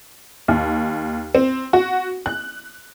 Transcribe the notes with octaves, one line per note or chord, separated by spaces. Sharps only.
D#2
C4
F#4
F#6